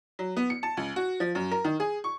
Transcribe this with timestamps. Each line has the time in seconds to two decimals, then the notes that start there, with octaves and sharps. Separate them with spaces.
0.19 F#3
0.37 B3
0.50 C#7
0.63 A5
0.77 C#2
0.96 F#4
1.20 F3
1.35 F#2
1.51 A#4
1.65 D#3
1.80 G#4
2.04 C#6